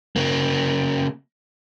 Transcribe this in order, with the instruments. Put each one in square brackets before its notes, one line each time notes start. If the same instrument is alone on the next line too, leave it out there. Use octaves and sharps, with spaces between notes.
[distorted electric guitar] C#3 A#3